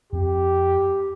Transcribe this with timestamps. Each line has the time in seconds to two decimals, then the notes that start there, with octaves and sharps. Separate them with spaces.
0.12 F2 C4 G4